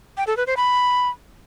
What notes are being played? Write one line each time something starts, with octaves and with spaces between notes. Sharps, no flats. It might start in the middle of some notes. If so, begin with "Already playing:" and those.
G5
A4
B4
C5
B5